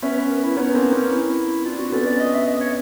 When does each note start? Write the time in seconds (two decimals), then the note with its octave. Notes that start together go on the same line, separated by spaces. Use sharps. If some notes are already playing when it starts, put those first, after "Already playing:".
0.02 B3 C#4 E5
0.16 B4
0.30 A#4
0.43 E4
0.57 B3 C#4 D#4
0.70 A#3 C4 D4
0.84 D#4
0.93 B3 C#4
1.11 E4
1.65 C4 D4 F4
1.79 F#4
1.92 B3 C#4 A4
2.06 D5
2.20 D#5
2.34 E5
2.47 D#5
2.60 C#5